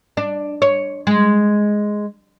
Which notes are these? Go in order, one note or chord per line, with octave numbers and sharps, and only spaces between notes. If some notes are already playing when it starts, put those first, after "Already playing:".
D4
C#5
G#3